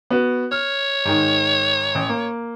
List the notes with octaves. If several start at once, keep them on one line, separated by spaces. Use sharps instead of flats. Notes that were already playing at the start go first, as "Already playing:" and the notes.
B3 F#4
C#5 F6
G#2 D#3
A1
A#3